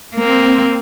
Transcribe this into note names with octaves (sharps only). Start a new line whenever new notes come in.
A#3 C4